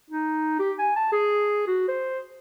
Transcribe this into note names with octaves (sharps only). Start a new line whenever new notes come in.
D#4
G4
G#5
A5
G#4
F#4
C5